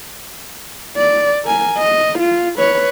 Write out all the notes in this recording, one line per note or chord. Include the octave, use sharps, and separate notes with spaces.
D5
A#4 G#5
D#5
F4
B4 C#5